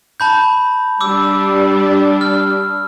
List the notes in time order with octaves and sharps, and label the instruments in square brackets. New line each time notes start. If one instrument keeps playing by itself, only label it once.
[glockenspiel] A5 B5 G6
[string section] G3 D4 [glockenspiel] D6 E6
[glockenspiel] F6